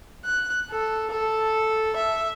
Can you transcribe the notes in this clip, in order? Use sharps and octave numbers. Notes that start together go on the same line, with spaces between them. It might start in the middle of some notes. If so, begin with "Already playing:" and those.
F#6
A4
A4
E5